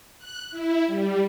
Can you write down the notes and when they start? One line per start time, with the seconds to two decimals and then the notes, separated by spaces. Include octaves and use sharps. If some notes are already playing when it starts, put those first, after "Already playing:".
0.18 F#6
0.51 E4
0.86 G3